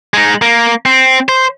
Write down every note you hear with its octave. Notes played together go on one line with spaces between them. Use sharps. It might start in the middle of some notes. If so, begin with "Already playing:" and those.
G#3 D#4
A#3
C4
C5